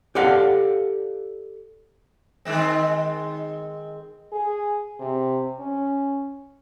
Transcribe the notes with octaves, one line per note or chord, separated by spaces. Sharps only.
G4 A4 D5 F5 F#5
D#3 G#3 C4
G#4
C3
C#4